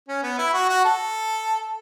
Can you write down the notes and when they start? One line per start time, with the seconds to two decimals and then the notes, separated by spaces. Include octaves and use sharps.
0.08 C#4
0.23 B3
0.38 E4
0.53 F#4
0.69 F#4
0.85 A4